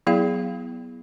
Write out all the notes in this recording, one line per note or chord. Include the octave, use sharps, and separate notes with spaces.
F#3 B3 E4 G#4 F5